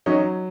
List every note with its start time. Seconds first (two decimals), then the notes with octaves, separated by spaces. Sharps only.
0.06 F#3 C#4 D#4